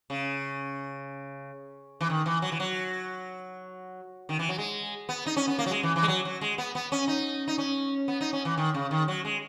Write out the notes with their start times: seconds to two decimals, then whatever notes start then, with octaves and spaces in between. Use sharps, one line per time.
0.10 C#3
2.01 E3
2.10 D#3
2.26 E3
2.42 F#3
2.52 E3
2.60 F#3
4.29 D#3
4.39 E3
4.49 F#3
4.58 G#3
5.09 B3
5.26 D#4
5.37 C#4
5.47 B3
5.59 A#3
5.66 F#3
5.71 G#3
5.83 E3
5.96 E3
6.03 G#3
6.08 F#3
6.25 F#3
6.41 G#3
6.58 B3
6.75 B3
6.92 C#4
7.08 D#4
7.48 D#4
7.58 C#4
8.08 B3
8.21 D#4
8.33 C#4
8.45 E3
8.58 D#3
8.74 C#3
8.91 D#3
9.08 F#3
9.25 G#3